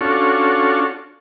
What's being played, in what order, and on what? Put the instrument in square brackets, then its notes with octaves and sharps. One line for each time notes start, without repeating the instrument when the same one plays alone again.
[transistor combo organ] C#4 D4 F4 F#4 A4 C#6